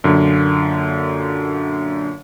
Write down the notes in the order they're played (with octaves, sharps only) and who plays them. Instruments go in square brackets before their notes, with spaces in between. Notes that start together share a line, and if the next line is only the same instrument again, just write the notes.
[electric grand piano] F#2 A#2 D3